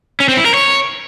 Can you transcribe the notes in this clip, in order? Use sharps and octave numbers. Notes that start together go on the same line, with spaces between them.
C#4
C4
E4
A#4
C#5